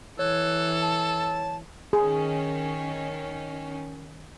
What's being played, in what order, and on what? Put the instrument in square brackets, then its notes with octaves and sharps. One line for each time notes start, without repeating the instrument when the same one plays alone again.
[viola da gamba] E3 [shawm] A4 [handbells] C#5 [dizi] F#6
[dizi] A5
[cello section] D#3 C#4 [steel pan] G#4